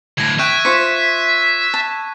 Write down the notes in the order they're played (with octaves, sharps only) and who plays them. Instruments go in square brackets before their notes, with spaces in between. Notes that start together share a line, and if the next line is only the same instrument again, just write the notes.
[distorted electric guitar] D2 A2 [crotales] G#6 A#6
[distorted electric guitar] E5 [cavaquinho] G5 [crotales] C#6 F#6 D#7
[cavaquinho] F4 C5 C#6 [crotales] B6
[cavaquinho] A5